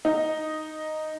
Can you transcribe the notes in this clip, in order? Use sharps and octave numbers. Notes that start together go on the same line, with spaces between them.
D#4